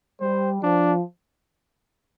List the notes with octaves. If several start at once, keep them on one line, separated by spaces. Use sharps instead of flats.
G3 C5
F3 D4